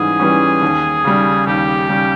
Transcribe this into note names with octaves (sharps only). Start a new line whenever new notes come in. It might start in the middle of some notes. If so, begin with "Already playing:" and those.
Already playing: G#2 E3 G3 C#4 G#4
E3 G3 C#4
D#2
C#3 G3
D#2 G4
C#3 G3